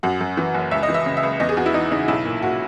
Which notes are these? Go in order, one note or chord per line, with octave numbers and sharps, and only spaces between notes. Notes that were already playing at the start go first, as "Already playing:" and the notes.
F#2 F#4
F#2
E3
F#1
C#2 E5
D#5
E3
E5
C#3
E5
C#2
E2 D#5
G#4
E2 F#4
E4
E3 D#4
C#3 D#4
B1 E4
A#2
A#2 F#4